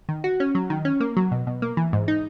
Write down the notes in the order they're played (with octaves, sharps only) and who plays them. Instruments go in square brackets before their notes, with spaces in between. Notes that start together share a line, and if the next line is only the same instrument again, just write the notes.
[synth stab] D#3
F#4
C#4
F#3
D#3
C#4
A#3
F#3
B2
B2
A#3
E3
G#2
D#4